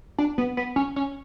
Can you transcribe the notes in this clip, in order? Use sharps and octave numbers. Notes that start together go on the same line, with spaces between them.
D4
B3
B3
C#4
C#4